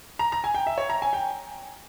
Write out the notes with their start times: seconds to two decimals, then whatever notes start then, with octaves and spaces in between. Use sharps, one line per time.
0.19 A#5
0.32 A#5
0.44 G#5
0.55 G5
0.67 E5
0.78 C#5
0.90 A#5
1.02 G#5
1.13 G5